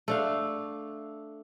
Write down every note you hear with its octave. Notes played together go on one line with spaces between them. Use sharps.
A3 D4 F5